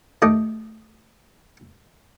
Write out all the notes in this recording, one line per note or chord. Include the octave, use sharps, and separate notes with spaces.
D#3 A3 G4 D#5